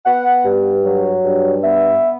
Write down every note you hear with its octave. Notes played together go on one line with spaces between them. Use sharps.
B3 F#5
G2
F#3
G2
B3 E5